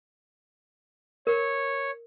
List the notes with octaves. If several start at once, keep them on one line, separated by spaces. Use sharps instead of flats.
A#4 C#5